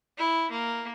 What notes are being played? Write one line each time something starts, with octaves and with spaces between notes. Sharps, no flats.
E4
A#3